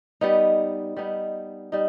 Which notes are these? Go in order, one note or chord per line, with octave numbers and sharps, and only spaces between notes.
G3 B3 D#4
G3 B3 D#4
G3 D#4